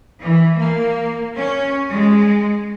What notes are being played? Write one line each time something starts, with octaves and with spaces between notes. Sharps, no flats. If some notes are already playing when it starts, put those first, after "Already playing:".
E3
A#3
C#4
G#3